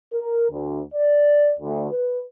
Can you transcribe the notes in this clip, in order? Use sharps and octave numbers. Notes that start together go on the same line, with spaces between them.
A#4
D2
D5
D2
B4